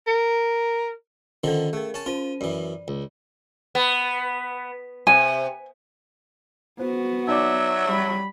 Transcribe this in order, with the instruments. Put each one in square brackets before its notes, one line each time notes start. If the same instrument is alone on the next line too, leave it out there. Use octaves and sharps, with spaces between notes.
[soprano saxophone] A#4
[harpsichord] D3 D#3 F3 [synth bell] C#4 A4
[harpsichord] A3 [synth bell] G#4 A#4
[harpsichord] C#4 A5
[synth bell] C#4 C5 D#7 [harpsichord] F4
[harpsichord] F#2 E3 [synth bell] D5
[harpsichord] C#2
[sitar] B3
[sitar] C3 [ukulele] G#5
[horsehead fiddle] B3 F#4 [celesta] C5
[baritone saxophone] F#3 [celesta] D#4 D5 D6 [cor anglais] E5
[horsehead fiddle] G3 B5